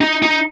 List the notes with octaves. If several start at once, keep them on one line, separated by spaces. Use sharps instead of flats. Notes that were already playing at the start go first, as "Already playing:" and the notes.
D#4
D#4